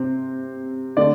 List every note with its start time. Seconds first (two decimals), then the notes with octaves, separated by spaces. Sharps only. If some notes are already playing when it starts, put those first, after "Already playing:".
Already playing: C3 C4
0.97 D3 A3 D5